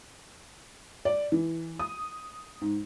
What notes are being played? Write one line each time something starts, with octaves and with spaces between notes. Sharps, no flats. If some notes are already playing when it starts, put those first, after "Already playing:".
D5
E3
D#6
G#2